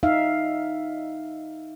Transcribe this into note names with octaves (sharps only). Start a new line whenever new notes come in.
D#4 E5 F5